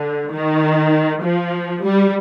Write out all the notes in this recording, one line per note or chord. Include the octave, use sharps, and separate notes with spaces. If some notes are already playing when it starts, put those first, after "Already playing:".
Already playing: D3
D#3
F3
G3